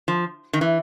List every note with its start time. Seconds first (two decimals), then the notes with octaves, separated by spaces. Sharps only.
0.08 F3
0.53 D#3
0.61 E3